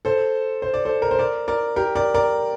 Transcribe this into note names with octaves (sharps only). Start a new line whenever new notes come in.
A4 C5
C5
D5
A4 C5
A#4
C5
A#4 D5
A#4 D5
G4 A#4
A#4 D5
A#4 D5